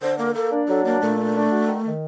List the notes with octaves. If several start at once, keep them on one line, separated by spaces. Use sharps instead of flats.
D3 C5
A#3 A#4
A#3 A4
D4
F#3 A4
A#3 D4
A#2 A3
D4
D4
F#4
D#3
D#3